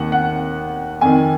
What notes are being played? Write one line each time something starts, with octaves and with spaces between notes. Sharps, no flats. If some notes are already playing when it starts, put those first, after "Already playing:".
Already playing: D#2 D#3 F#5
F#5
F2 D#3 G#5